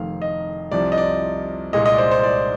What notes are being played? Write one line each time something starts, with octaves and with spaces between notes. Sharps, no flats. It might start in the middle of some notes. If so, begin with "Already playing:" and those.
Already playing: F1 F2 D#3 F5
D#5
C2 C3 F3 D5
D#5
D5
C2 A#2 G#3 D#5
D#5
D5
C5
C5
D5